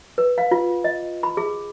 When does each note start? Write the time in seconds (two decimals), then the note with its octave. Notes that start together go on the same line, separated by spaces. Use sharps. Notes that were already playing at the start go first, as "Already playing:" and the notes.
0.18 B4
0.38 F5
0.51 F4
0.84 D#5
1.23 B5
1.37 G#4